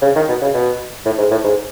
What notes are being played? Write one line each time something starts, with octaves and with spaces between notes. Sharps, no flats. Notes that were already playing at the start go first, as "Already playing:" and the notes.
C#3
D#3
B2
C#3
B2
A2
G#2
A2
G#2